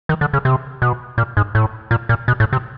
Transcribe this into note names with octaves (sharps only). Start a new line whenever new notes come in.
D#3
D3
C#3
C3
B2
A#2
G#2
A2
A#2
A#2
B2
A2
C3